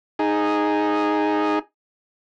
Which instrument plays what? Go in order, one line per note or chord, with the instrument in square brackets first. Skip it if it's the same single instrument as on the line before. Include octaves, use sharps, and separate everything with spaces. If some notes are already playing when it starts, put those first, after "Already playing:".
[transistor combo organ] D#4 G#4